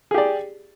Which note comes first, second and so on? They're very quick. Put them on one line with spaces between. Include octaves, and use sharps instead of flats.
G#4 G4 D5